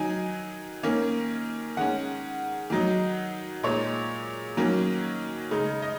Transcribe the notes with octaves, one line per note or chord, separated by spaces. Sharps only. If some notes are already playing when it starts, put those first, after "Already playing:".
Already playing: D#3 F#3 D#4 G#5
D#3 A#3 C#4
D#3 G#3 C#4 F#5
D#3 F#3 D#4
A#2 G#3 D#4 C#5
D#3 F#3 A#3 C#4
C#3 G#3 D#4
D#5